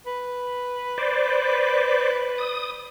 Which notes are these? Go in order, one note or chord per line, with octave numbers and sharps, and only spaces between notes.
B4
C5 D5
D#6